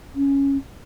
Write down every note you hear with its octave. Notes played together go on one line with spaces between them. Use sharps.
C#4